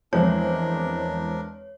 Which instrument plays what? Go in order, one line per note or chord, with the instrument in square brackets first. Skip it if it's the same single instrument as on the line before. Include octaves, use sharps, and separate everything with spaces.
[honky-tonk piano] E2 G#3 C4 [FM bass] F3 [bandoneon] D4 A#4 [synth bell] C#5